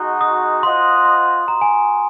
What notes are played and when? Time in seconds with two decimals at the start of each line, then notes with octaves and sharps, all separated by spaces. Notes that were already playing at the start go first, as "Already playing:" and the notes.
Already playing: G#3 D#4 F#4
0.21 D#6
0.63 F4 C5 D#5 F#5 C6
1.05 C6
1.48 F#4 A#5
1.61 G#5